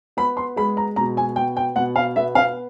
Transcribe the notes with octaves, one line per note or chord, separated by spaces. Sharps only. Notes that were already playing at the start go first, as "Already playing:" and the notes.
B3 B5
C6
G#3 B5
A#5
B2 A#5
G#5
B3 G5
G5
B2 F#5
F5
B3 E5
F5